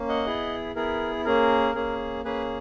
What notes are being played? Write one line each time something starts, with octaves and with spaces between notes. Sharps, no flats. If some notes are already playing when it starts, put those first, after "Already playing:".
Already playing: A#3 C#4
D#5 F#5
B3 E4 G#4
B3 E4 G#4 A#4
A#3 C#4 G#4 A#4
A#3 C#4 G#4
A#3 C#4 G#4 B4